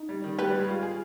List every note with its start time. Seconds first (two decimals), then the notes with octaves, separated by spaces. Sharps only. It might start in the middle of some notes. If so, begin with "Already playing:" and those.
Already playing: D#4
0.09 G3
0.24 D#3
0.38 G3 G4 B4
0.49 G3
0.59 G#3
0.68 F4
0.83 G#4